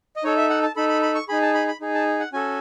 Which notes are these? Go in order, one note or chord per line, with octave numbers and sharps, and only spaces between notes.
D#5
D#4 A4 C#5
E5
F#5
A5
D#4 A4 B5
B5
B5
C#6
D#4 G#4 B5
A5
B5
B5
D#4 G#4
A5
F#5
C#4 F#4 A4 G#5